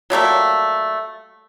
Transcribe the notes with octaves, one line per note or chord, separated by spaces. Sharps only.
F#3 G3 A3 A#3